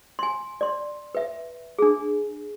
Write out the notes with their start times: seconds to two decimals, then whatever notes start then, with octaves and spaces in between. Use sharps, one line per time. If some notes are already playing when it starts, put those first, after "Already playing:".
0.19 G#5 C6
0.61 D5 C6
1.15 B4 E5
1.79 D4 G#4